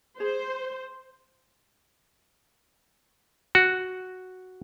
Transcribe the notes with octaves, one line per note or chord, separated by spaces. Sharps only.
G#4 C5
F#4